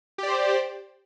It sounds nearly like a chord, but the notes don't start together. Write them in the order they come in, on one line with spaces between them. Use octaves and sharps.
G4 D5 C5